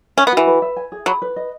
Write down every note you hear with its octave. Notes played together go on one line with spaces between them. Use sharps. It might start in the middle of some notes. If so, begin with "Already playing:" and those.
C#4 E5
B3
E3 F#4
B4
E5
G#5
G#4
F#3 B5
B4
D#5